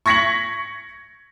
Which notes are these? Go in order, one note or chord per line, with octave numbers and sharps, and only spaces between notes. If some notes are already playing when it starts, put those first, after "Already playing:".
C#6 G#6 A#6 B6 C#7 F#7